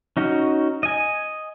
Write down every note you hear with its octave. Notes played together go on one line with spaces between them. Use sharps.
C#4 D#4 F#4
D#5 G#5